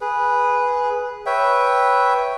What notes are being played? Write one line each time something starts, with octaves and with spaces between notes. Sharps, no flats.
G#4 B4
B4 C#5 E5 G5